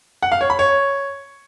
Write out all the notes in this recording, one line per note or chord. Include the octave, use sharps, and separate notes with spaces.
F#5
F5
C#5
B5
C#5